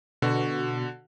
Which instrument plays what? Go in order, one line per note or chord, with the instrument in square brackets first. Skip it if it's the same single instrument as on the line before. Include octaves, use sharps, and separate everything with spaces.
[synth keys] B2 [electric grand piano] D3 F#4